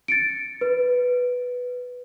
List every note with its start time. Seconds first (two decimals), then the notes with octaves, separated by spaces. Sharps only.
0.08 A6 C#7 D7
0.61 B4